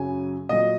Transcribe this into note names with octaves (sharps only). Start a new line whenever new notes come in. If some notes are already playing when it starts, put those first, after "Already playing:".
Already playing: F#2 C#3 F#3 G#5
A#2 F#3 D#5